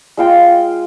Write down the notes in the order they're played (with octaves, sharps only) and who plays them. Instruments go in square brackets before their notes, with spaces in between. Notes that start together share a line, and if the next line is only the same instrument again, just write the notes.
[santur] G#3 F4 G5